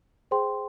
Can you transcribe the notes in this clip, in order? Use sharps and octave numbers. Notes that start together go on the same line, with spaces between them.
G#4 C5 G5 C6